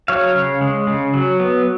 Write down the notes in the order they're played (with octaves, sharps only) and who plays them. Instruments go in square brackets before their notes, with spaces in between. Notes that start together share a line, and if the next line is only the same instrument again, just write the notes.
[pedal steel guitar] F#3 C#5 F5
C#3
G#3
C#3
F#3
B3